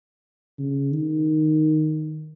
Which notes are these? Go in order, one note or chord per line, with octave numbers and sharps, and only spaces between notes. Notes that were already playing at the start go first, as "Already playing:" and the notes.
C#3
D#3